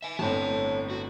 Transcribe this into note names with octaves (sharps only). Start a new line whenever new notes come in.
E5 G#5
G1 A2 C4 C#5 A5
F#4